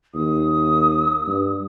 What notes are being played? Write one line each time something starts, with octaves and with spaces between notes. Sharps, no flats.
D#2 D#6
G2